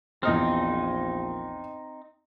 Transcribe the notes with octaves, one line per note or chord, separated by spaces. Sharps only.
A#1 E2 C4 D#4 D#5 F6